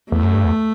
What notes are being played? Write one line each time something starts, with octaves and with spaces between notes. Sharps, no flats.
E2 A3
F#2
G2
E2